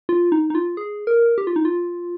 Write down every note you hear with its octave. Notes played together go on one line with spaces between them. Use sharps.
F4
D#4
D#4
F4
G#4
A#4
G4
F4
D#4
F4